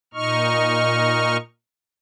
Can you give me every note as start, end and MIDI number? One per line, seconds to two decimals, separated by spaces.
0.14 1.37 46
0.14 1.37 63
0.14 1.37 75
0.14 1.37 85
0.14 1.37 89